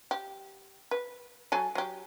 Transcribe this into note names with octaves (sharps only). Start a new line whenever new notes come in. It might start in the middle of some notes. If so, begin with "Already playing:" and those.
G4
B4
F#3 A4 G#5
F#3 G4